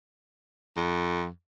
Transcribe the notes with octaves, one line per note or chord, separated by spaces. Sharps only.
F2